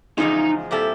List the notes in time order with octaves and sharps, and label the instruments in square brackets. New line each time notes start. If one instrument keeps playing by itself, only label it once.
[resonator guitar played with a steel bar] E2 C#3 F3 G#3 [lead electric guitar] D#4
[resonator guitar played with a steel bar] A#2 G3 C4 E4 A4